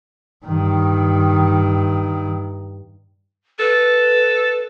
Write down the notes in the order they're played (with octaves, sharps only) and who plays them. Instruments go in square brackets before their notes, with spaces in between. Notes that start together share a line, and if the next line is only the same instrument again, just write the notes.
[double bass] G2 D#3
[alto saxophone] A4 [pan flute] B4